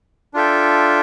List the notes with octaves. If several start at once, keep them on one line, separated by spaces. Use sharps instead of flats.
D4 F4 A4 E5 G5